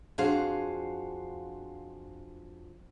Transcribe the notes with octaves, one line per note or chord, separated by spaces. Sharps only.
F2 D4 F#4 G#4 C5 F5